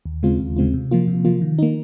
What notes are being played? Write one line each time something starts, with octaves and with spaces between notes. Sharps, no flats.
D#2
C#3 G#3 C4 F4
D#2
C#3 G#3 C4 F4
C3
F3 A#3 F4
C3
F3 A#3 F4
D#3
A#3 D#4